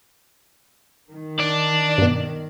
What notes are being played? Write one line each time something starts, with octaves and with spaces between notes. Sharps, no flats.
D#3
D4 D5
G2 B2